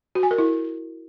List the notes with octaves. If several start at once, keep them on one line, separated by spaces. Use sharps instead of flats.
F#4
G#5
A#4
E4